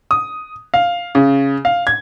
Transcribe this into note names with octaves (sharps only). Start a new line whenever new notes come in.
D#6
F5
C#3
F5
G#6